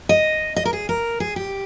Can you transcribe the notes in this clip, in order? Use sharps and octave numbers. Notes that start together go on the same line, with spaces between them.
D#5
D#5
A#4
G#4
A#4
G#4
G4